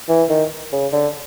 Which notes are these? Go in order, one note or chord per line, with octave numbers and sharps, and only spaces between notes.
E3
D#3
C#3
D3